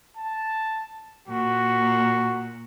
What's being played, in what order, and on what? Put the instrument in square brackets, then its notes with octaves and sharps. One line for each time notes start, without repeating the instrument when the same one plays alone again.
[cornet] A5
[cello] A#2 [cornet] F#4